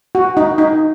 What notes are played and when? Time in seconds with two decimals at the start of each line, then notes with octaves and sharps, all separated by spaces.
0.15 F#4
0.37 D#4
0.58 D#4